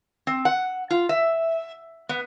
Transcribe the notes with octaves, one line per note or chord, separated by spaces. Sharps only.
C4
F#5
F4
E5
B3